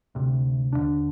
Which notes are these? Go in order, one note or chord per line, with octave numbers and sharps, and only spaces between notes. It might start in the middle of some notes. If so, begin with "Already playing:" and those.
D2 C3
F1 D#2 D3 D4